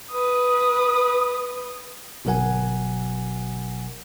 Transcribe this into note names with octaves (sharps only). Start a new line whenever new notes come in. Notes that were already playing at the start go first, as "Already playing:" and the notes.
B4 D#6
G1 B2 F#3 A#4 F#5 G#5